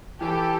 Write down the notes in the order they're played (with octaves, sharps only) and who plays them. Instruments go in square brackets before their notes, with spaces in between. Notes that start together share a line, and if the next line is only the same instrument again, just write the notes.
[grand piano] E3 [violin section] G4 A4